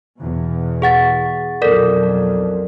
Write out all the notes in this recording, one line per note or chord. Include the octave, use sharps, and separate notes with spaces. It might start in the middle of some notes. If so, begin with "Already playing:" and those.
E2 B2
G#4 F#5 A6
B1 F2 F#3 A4 A#4 D5